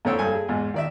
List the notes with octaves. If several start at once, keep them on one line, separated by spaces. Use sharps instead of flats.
F2 D3 C4 C#5 G5 E6
G2 A4 G#5
G#4
E2 G#2
D#3 D5 E5